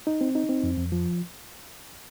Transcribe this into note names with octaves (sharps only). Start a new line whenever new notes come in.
D#4
C4
D#4
C4
F2
F2
F3